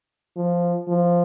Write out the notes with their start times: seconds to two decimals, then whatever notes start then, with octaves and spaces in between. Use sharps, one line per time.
0.37 F3
0.88 F3